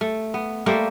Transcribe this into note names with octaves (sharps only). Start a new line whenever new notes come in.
A3
B3
G3 A3 A#3 C5